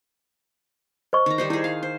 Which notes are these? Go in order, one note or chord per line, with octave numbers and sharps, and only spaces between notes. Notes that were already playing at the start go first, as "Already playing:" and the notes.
C5 D#5 C#6
D#3 A#5
G3 D#4 C5
D#4 E4 G#4
F5
C5